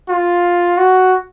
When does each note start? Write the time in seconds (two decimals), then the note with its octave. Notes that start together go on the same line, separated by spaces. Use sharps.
0.09 F4
0.78 F#4